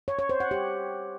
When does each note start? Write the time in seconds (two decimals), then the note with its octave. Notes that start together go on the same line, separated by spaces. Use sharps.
0.08 C#5
0.19 C#5
0.29 C5
0.40 F#5
0.51 G4